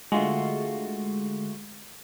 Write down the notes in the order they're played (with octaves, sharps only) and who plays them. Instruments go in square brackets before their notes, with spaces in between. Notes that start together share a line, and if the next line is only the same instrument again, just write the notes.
[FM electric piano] D3 G#3 [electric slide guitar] A3 F4 F#4